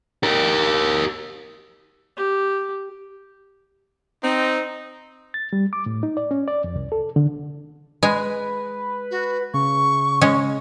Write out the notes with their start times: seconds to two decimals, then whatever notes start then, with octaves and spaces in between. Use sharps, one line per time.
0.23 G4 A#4
2.17 G4
4.23 C4 D#4
5.34 A6
5.53 G3
5.73 D6
5.86 A2
6.03 D#4
6.17 D5
6.31 C#4
6.48 D5
6.64 F2
6.76 C2
6.92 A4
7.16 D3
8.03 G#3 B4 G#5
9.11 F#4
9.54 C#3 C#6
10.21 G#3 C#4